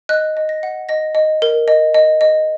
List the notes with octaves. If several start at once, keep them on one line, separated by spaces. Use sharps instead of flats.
D#5 F#6
D#5
A#6
F#5
D#5 A#6
D#5
A#4
D#5
D#5
D#5